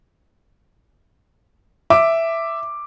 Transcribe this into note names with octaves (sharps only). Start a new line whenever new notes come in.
E5 D6